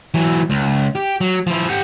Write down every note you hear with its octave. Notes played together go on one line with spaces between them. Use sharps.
E3 F#3
C#2
G4
F#3
F3 E4
G4 F#5